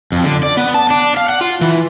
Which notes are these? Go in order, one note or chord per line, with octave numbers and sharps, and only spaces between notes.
F2
D3
D5
B3
A5
D4
F5
F#5
F4
E3